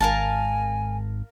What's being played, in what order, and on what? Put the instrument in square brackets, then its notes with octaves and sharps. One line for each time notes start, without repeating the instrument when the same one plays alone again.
[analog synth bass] G#1 [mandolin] A#4 F5 A5 [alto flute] G#5